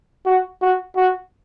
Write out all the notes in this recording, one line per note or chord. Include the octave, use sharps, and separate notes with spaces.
F#4
F#4
F#4